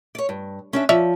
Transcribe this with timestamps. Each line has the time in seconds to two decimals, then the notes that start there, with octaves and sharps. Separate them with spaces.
0.15 C#5 D5
0.29 G2
0.73 C#4 D4 E5
0.89 F3 C#5 D5 E5